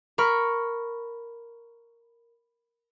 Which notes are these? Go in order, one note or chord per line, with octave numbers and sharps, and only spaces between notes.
A#4 B5 C#6 F6